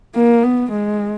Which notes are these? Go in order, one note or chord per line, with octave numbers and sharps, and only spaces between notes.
A#3
B3
G#3